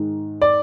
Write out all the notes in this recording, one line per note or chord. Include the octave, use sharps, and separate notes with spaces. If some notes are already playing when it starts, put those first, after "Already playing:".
Already playing: G#2 D#3 G#3
D5